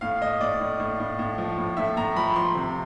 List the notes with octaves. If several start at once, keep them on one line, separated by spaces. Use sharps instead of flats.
A2 F5
A2 D#5
A2 D5
A2
A2
A2
A2
F3
A2
A2 E5
A2 A#5
F3 B5
F3 C6
C3